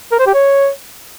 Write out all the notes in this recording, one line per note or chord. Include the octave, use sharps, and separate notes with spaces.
A#4
C5
G4
C#5